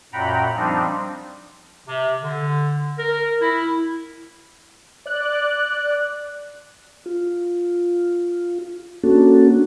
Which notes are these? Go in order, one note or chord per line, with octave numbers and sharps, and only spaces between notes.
F#2 A#2 F#5 G5 A#5 B5
F3 G3 C4 D4 D#4
C3
D3
A#4
E4
D5 F#6
F4
A#3 C#4 D4 F#4 A4